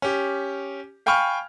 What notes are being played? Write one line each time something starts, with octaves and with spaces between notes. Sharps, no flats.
C#4 G4
F5 G5 G#5 B5 C#6 F6